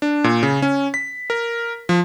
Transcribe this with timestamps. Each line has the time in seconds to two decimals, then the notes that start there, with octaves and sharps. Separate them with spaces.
0.02 D4
0.24 A#2
0.43 C#3
0.62 C#4
0.94 B6
1.30 A#4
1.89 F3